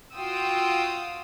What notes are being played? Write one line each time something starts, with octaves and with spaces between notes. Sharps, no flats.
F4 F#4 F5 G5 D#6 E6